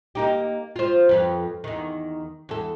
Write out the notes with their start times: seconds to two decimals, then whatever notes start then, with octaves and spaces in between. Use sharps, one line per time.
0.15 A#3 D#4 G4
0.76 F4 C5
1.09 F2 B4 F5
1.64 E2 D#3
2.49 E2 A4